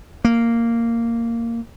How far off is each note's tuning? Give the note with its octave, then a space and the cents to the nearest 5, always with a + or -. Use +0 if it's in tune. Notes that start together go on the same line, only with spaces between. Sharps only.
A#3 -10